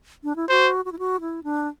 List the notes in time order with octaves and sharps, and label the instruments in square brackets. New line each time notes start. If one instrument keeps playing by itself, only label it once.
[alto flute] D4
E4
[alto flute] F#4 [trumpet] C5
[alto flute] F#4
E4
F#4
E4
D4